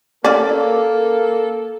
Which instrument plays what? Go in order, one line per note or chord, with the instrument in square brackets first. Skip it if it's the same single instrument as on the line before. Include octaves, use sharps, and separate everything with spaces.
[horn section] A#3 A4 [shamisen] C#4 D5